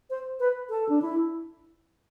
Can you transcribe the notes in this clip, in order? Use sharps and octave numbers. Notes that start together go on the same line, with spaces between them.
C5
B4
A4
D4
E4